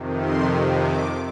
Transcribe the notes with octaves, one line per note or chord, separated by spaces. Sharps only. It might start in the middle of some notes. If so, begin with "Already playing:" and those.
Already playing: F2 C3 D#3
C6
D6